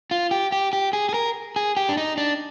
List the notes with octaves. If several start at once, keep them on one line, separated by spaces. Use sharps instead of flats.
F4
G4
G4
G4
G#4
G#4
A#4
G#4
G4
D4
D#4
D4